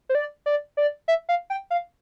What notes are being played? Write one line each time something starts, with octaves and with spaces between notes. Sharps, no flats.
C5
D5
D5
D5
E5
F5
G5
F5